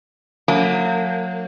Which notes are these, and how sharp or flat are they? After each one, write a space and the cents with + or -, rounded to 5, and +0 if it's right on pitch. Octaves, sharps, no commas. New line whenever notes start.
F#3 -30 A#3 -35 D4 -45